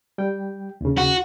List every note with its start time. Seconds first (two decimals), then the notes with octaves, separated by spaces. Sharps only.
0.18 G3 G5
0.81 D#2 C#3
0.97 F#4